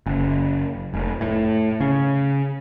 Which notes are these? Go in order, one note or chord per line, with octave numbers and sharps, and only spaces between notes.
F#1
F1
A2
C#3